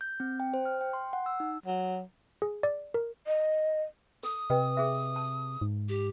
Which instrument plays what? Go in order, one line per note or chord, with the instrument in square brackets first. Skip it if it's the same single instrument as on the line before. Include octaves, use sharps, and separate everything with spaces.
[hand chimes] G6
C4
G5
C5
F6
G5
C6
F#5
E6
D#4
[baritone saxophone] F#3
[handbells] G#4
D5
A#4
[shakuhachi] D#5
[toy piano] A4 [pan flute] D#6
[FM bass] C3 [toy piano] B4 D#5 G5
[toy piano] G#4 E5
A5
[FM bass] G#2
[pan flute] G4